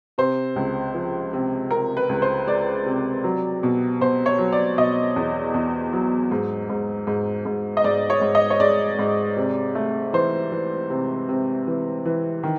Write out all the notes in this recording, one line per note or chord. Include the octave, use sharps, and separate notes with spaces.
C3 C5
C#2
F3
C3
C3 A#4
B4
C#2
C5
G#3 D5
C3
F#3
B2
B2 C5
C#5
F#3
D5
B2 D#5
E2
E2
F#3
G#2
G#2
G#2
G#2
D#5
G#2 D5
C#5
G#2
D#5
C#5
G#3 D5
G#2
C3
A3
E3 C5
E3
C3
C3
E3
E3
D#3